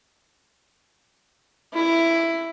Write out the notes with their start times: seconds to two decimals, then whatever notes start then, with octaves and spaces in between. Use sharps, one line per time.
1.74 E4